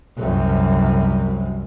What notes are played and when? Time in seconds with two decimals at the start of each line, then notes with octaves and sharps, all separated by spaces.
0.17 C2 F#2